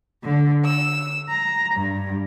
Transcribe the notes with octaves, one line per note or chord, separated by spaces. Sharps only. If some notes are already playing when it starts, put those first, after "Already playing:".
D3
E6
A#5
G2